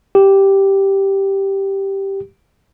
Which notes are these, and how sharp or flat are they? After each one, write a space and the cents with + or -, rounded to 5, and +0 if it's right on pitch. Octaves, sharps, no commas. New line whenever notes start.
G4 -5